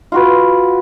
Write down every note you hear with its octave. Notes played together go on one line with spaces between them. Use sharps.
F4 F#4 B4